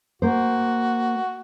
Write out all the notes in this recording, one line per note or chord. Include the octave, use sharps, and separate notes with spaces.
A#3 F#4 C5